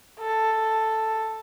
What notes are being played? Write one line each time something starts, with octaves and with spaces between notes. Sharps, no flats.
A4